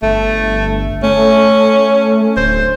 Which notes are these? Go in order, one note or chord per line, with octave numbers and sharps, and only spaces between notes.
G1 A3
A3 C#4
D1 C5